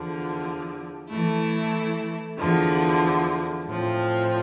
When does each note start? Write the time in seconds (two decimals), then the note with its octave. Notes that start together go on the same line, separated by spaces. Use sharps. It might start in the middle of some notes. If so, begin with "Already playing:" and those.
Already playing: E2 D3 F3
1.10 E3 A3 E4 A4
2.39 E2 D3 F3
3.67 A2 F3 C4